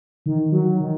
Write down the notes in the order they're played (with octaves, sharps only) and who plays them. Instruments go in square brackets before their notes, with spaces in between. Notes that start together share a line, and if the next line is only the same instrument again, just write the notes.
[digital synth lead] D#3
F#3
D#3